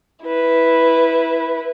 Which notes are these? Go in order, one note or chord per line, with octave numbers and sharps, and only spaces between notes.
E4 B4